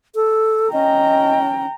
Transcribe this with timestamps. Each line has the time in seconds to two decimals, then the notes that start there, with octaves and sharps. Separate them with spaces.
0.15 A4
0.73 C#4 D#5 G5 A#5